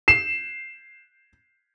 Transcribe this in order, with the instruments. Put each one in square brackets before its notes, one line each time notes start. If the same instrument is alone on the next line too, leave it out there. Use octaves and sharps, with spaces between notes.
[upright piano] C7 E7